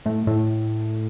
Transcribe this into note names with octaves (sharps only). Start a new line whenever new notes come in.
A2
A2